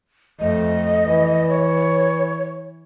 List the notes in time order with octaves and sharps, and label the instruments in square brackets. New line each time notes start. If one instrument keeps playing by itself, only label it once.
[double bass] F2 A3 [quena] D#5
[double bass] E3
[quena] C#5